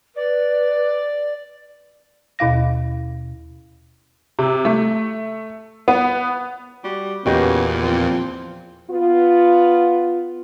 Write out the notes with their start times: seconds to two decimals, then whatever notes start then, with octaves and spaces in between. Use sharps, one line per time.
0.16 B4 D5
2.39 D#2 B2 E4 F5 A#6
4.39 C3
4.65 A3
5.88 B3
6.84 G3 F#4
7.26 E2 A#2 C#3 B3 F#4 G4 D#5
7.82 F3 C4
8.91 B3 F4